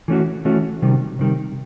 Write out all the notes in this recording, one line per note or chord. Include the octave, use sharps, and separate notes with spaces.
E3 A3 C#4 F#4
E3 A3 C#4 F#4
C3 D#3 G3
C3 D#3 G3